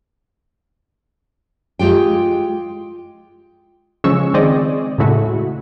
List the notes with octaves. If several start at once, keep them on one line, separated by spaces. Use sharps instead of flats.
G#3 F4 G4 G5
C#3 F3 G#3 C#4 C#6 E6
D#3 G#3 C4 G#4 D5 D#5
A2 C#3 G#3 A3 E4 F#4